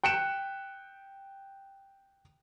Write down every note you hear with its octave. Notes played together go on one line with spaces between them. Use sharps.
G5 F#6 C#7 D7 E7